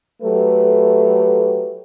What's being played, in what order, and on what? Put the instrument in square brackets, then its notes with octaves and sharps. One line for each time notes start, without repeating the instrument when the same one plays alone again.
[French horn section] F#3 A3 G4 A4 B4